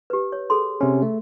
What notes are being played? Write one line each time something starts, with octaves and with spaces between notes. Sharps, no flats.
G4 B4
C#5
G#4 A4 C6
C3 C#4
A3